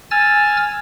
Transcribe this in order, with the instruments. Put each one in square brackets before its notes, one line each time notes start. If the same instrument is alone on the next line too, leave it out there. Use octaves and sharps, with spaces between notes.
[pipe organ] G#5 E6 F6 A6